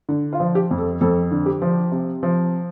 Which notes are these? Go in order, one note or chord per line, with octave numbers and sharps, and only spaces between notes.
D3
F4
F3
G4
F2
A4
F2 A4
D3
G4
F3
C3
F3